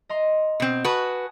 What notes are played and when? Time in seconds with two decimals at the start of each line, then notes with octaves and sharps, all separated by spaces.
0.09 D#5 A#5 C6
0.60 B2 C4
0.84 F#4 B4 G#5 A5 D#6